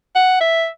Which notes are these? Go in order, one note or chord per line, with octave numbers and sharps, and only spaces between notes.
F#5
E5